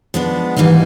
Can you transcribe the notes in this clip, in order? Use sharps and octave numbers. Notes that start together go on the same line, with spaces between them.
F3 G#3 B3 D4
G#2 E3 G3 A#3 D#4